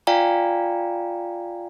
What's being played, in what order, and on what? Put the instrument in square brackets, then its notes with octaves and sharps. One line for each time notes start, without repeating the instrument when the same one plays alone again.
[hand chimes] F4 D5 F5 G5 G#5 A#5